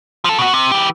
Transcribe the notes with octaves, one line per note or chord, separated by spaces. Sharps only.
F3 A4
B2 F#4
C3
E3 G4